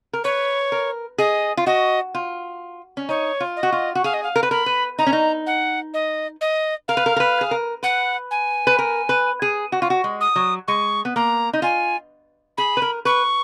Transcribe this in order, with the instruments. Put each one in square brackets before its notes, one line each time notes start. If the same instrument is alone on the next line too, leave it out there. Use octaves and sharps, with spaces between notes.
[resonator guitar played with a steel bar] A#4
[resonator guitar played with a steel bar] B4 [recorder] C#5
[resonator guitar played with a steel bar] A#4
[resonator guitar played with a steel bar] G#4 [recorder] D#5
[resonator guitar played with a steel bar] F4
[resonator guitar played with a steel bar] F#4 [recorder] D#5
[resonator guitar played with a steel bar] F4
C#4
[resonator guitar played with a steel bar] D#4 [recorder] C#5
[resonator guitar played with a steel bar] F4
[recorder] D#5
[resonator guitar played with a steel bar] F#4
F4
F#4
[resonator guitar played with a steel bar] G#4 [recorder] F5
[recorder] D#5
F5
[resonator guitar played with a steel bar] A#4
B4
[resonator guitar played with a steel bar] A#4 [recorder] B5
[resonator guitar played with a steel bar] B4
[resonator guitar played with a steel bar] D#4 [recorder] A#5
[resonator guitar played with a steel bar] C#4
D#4
[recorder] F#5
D#5
D#5
[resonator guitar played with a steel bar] A#4 [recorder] F5
[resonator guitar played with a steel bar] B4
A#4
A#4
B4
G#4
A#4
[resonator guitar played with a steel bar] B4 [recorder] F#5
[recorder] G#5
[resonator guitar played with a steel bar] B4
A#4
B4
G#4
F#4
F4
F#4
G#3
[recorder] D#6
[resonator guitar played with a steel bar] F#3
[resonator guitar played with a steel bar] G#3 [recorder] C#6
[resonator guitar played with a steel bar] B3
[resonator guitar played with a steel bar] A#3 [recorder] A#5
[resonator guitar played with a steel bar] D#4
[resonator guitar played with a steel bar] F4 [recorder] G#5
[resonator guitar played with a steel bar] G#4 [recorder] B5
[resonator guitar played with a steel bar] B4
A#4
[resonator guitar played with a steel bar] B4 [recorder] C#6